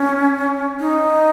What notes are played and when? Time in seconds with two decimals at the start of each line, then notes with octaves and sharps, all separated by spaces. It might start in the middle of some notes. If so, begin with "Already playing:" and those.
Already playing: C#4
0.80 D#4